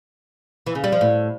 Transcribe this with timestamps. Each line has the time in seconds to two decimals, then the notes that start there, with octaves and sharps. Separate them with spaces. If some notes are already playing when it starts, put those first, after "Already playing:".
0.67 E3
0.75 C#3
0.84 G3
0.92 F3
1.01 A2